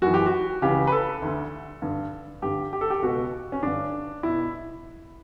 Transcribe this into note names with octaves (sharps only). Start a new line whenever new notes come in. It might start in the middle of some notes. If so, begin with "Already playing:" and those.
F#2 E3 F#4
G4
F#4
C#2 C#3 E3 G4
B4
A4
D2 D3
G2 D3
G2 D3 G4
G4
A4
G4
C#2 B2 F#4
C#4
G2 D3 D4
B2 E4